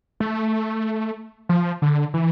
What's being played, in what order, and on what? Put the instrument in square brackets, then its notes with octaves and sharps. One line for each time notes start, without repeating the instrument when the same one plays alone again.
[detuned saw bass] A3
F3
D3
E3